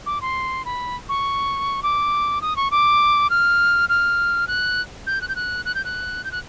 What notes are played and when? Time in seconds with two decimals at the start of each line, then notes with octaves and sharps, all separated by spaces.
0.06 D6
0.21 C6
0.65 B5
1.09 C#6
1.83 D6
2.41 D#6
2.56 C#6
2.71 D6
3.30 F6
3.89 F6
4.48 F#6
5.07 G6
5.21 F#6
5.29 G6
5.36 F#6
5.65 F#6
5.75 G6
5.85 F#6
6.24 G6
6.32 F#6